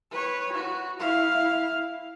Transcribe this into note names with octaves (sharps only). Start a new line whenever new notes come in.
B4 C#5
F#4
E4 F5